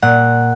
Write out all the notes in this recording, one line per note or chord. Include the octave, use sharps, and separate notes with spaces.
A#2 F#5